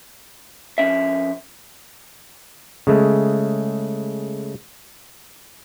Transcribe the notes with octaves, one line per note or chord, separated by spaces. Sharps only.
F2 C#4 E5
C#3 G#3 A3